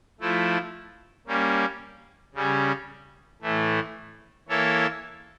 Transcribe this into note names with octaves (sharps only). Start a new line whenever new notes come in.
F3 A3 E4
G3 A#3 C#4
C#3 G3 C#4
A2 E3 A3
E3 A#3 E4 A4 C#5